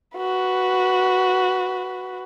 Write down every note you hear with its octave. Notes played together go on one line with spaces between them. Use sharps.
F#4 B4